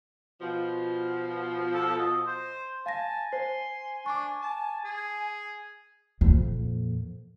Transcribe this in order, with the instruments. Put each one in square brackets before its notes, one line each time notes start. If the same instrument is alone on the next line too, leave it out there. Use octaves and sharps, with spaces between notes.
[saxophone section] B2 F3
[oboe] A4
D#5
C5
[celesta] F5 A#6 [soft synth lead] G#5 [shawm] A5
[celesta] C5 [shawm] C6
[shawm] D4 [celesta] C#6 D6
[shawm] A5
G#4
[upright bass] F2 A#2